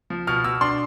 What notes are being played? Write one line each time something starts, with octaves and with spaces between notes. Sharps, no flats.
F3
B2 F6
B2 E6
D4 C6